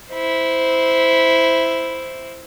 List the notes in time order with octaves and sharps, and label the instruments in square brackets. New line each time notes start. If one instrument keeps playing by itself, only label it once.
[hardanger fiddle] E4 C5